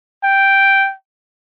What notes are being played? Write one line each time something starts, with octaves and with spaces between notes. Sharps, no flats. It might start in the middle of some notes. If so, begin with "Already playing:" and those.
G5